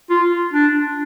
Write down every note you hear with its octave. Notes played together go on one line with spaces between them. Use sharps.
F4
D4